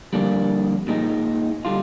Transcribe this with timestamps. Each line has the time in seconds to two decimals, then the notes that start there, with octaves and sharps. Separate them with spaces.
0.13 F2 D3 G3 A#3 D4
0.88 A#2 G#3 D#4
1.65 D3 G3 D4 F4